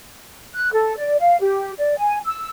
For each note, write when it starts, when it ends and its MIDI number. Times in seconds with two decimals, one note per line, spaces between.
0.56 0.70 90
0.73 0.96 69
0.96 1.17 74
1.20 1.39 77
1.40 1.71 67
1.78 1.96 74
1.98 2.19 80
2.26 2.49 88